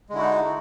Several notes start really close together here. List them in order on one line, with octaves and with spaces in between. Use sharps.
G#3 D3 E4 F#4 D#4